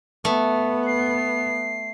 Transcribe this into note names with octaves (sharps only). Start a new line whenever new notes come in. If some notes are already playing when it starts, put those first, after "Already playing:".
A3 B3
C7